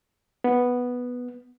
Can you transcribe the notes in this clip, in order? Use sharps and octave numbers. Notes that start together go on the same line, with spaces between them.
B3